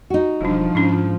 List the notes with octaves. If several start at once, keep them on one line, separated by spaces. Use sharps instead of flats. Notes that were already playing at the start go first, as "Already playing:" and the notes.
D#4 F#4
E1 F3 G3 D4
G#2 C#4 D4 E4